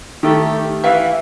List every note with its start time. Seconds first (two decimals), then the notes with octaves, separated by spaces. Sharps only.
0.23 D#3 A3 G4
0.84 E3 E5 F5